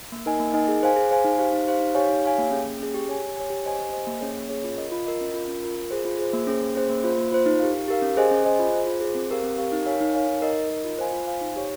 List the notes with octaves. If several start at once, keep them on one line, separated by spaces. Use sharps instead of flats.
A#3
D#4 A#4 D#5 G#5
A#3
D#4 A#4 D#5 G#5
G#4
C5 F5 G#5
G#4
C5 F5 G#5
D#4
G4 C5 F5
D#4
G4 C5 F5
D#4
G4 C#5 F5 G#5
D#4
G4 C#5 F5 G#5
A#3
C#4 G#4
A#3
C#4 G#4
G4
C#5 G#5
G4
C#5 G#5
G4
C5 D#5 G#5
G4
C5 D#5 G#5
A#3
C#4 G#4 C#5
A#3
C#4 G#4 C#5
F4
A#4 D#5
F4
A#4 D#5
C#4
F4 A#4
C#4
F4 A#4
F4
G#4 C5
F4
G#4 C5
A#3
C#4 G#4 C5
A#3
C#4 G#4 C5
A#3
F4 C5
A#3
F4 C5
D#4
G4 A#4 F5
D#4
G4 A#4 F5
C#4
G#4 C5 D#5 G#5
C#4
G#4 C5 D#5 G#5
F4
G#4 C5
F4
G#4 C5
C4
G4 A#4 F5
C4
G4 A#4 F5
D#4
A#4 C#5 F5 G#5
D#4
A#4 C#5 F5 G#5
D#4
A#4 D#5
D#4
A#4 D#5
F4
C5 F5 G#5
F4
C5 F5 G#5
D#4
G4 C#5